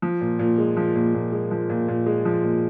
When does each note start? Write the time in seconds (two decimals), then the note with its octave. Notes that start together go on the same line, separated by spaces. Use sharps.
0.02 F3
0.21 A#2
0.39 A#2
0.58 G#3
0.77 F3
0.95 A#2
1.14 A#2
1.32 G#3
1.51 F3
1.70 A#2
1.88 A#2
2.06 G#3
2.25 F3
2.44 A#2